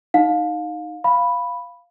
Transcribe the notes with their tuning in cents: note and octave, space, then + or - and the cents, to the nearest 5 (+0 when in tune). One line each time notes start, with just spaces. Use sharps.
D#4 +0 F5 +25
F5 +0 B5 +0